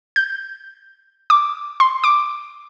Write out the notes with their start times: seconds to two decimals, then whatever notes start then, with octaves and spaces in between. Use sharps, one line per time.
0.16 G6
1.30 D6
1.80 C6
2.04 D6